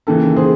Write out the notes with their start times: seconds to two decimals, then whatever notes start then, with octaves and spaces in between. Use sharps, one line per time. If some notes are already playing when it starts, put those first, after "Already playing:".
0.07 D#2 C#3 E3 A4
0.36 G#4 C5